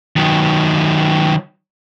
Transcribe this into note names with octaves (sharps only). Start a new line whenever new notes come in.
D#3 F#3